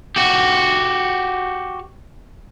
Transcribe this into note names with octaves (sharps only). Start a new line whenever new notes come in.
F#4 G4